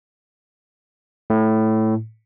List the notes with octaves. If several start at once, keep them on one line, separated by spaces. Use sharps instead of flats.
A2